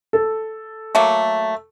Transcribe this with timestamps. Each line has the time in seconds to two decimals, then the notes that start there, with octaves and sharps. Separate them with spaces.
0.13 A4
0.95 F#3 A3 A#3